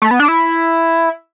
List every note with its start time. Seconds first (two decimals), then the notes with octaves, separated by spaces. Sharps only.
0.02 A3
0.11 B3
0.20 D4
0.28 E4